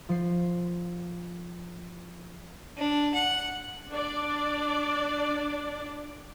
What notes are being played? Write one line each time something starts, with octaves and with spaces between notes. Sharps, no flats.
F3 C7
D4
F#5
D4 D5